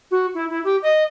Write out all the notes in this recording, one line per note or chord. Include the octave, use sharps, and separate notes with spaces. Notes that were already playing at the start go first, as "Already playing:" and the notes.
F#4
E4
E4
G4
D#5